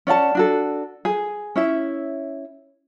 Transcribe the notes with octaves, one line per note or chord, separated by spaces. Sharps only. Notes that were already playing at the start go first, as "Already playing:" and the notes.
C#4 D5 F#5 A5
D4 F#4 A4
G#4
C#4 E4 E5